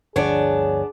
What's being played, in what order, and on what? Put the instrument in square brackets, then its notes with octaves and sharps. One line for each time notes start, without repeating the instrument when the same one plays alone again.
[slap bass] G1 D2 F3 [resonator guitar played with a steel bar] B3 D4 [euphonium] G#4 [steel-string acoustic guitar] C#5 D5